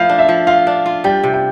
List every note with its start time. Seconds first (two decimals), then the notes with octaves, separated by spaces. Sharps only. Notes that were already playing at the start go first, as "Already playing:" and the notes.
Already playing: F3 A3 E4 F5
0.09 D4
0.19 E5
0.29 F3
0.47 F4 F5
0.67 D4
0.86 F4
1.04 G3 G5
1.23 C3
1.34 G5